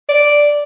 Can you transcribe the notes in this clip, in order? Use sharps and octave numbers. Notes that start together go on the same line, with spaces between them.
D5